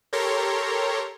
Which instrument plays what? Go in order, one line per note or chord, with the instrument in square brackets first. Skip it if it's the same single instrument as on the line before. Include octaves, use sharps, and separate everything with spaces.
[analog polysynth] G4 A4 A#4 C#5 A#5 C6